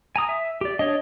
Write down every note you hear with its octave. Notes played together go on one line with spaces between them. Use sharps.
G#5 A#5 D#6
E5
G4 D5
D4 C#5 D#5